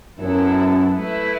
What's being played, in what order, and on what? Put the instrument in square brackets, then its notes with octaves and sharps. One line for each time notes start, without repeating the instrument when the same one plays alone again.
[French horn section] F#2 [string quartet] F#3 B3 E4 A4
[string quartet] A3 E4 B4